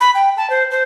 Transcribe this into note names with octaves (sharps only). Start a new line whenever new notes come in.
B5
G5
A5
C5
C5